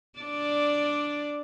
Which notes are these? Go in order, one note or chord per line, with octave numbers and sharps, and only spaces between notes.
D4 D5